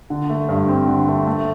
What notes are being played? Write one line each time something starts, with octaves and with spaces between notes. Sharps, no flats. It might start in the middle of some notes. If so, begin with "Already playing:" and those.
D3
A3
G2
C4
D3
A3
A3